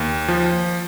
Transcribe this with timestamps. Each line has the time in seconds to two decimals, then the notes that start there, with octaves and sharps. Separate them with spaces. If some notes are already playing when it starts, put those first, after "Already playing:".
Already playing: D#2
0.28 F3